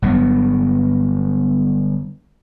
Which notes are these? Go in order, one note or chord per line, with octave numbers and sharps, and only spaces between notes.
G1 G2 F#3 B3